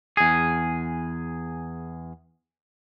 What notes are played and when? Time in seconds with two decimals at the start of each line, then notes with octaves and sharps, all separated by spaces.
0.17 E2 G#4